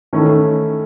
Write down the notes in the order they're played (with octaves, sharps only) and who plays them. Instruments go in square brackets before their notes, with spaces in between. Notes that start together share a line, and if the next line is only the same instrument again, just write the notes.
[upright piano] D#3 A3 C#4 E4